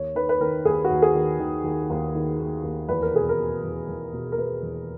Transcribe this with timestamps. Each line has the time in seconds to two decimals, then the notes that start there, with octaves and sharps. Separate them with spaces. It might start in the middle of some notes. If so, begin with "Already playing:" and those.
Already playing: D#2 C#5
0.15 D#3 B4
0.29 B4
0.41 D#3 A#4
0.65 D#2 G#4
0.85 F#4
0.90 D#2
1.02 G#4
1.15 D#3
1.39 D#3
1.64 D#2
1.90 D#2
2.15 D#3
2.40 D#3
2.63 D#2
2.89 E2 B4
3.02 A#4
3.14 B2 G#4
3.29 A#4
3.39 B2
3.64 E2
3.89 E2
4.13 B2
4.32 A#4
4.38 B2 B4
4.63 E2